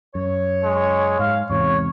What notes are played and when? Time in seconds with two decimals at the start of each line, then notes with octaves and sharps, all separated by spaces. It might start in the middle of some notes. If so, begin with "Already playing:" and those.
0.15 F#2 C#5
0.64 G#3
1.19 G#2 F5
1.50 E2 G#2 C3 C#5